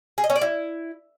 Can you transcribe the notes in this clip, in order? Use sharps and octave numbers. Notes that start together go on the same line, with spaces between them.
G#4
D#5
C#4
D5
E4